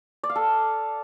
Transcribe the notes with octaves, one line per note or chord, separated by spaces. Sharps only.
D5
F5
A4